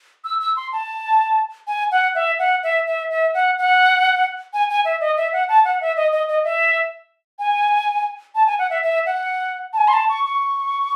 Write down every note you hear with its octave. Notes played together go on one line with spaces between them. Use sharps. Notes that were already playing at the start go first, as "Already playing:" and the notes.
E6
E6
C6
A5
G#5
F#5
E5
F#5
E5
E5
E5
F#5
F#5
G#5
G#5
E5
D#5
E5
F#5
A5
F#5
E5
D#5
D#5
D#5
E5
G#5
A5
G#5
F#5
E5
E5
F#5
A5
G#5
C6
A5
C#6
C#6